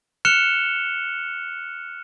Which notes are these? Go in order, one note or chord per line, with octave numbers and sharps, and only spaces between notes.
F6 F#6 C#7 E7 F7 G7